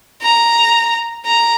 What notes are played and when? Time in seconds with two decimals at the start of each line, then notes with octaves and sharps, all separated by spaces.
0.22 A#5
1.26 A#5